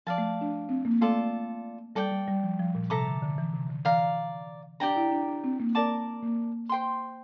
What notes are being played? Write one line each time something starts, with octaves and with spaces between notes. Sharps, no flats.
F3 D5 F5 A5
A3
D4
C4
A#3
A3 F4 A4 D5
G3 A4 D5 G5
G3
G3
F3
F3
A#2
C3 A4 E5 A#5 D6
D3
D3
E3
C3
D3
E3 D5 F5 A#5
D4 G4 D5 G5 A#5
E4
D4
D4
C4
A#3
A#4 D5 A5 D6
A#3
C5 G5 C6